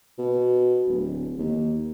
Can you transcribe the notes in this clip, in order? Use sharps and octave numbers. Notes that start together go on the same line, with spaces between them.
B2
D1
D#2